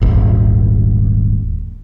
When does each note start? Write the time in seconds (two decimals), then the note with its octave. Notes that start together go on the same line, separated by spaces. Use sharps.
0.01 D#1 G#1